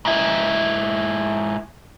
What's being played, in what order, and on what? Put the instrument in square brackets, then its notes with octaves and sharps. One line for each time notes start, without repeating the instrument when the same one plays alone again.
[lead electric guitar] G#2 E4